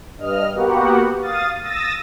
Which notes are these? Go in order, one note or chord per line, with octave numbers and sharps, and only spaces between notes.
G2 D#5 F6
A#3 B3 F#4 G4 F#5
F5 D#6 A6
D#6 E6 A6 A#6